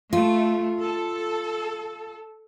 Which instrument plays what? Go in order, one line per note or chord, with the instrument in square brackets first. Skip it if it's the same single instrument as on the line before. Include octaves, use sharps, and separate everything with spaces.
[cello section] A3 [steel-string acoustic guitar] F4
[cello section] A4